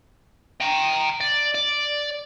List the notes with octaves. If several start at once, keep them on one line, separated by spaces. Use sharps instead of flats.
G5 A#5
D5
D5